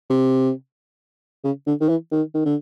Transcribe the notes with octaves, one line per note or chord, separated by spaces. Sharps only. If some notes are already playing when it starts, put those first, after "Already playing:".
C3
C#3
D3
D#3
E3
D#3
D#3
D3